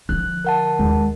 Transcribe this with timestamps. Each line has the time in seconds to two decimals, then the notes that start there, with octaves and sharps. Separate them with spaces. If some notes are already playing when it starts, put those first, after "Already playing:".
0.09 D3 F3 F#6
0.44 A#4 F#5 A5
0.79 D#2 G#3